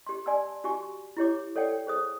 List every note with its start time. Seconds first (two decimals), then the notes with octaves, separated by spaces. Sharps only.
0.07 G4 C6
0.26 D5 G#5 A5 C6 E6
0.64 F#4 G4 G#5 C#6
1.17 E4 G4 C#5 D6
1.56 A4 C#5 D5 F#5 G5
1.87 G#4 C5 D#6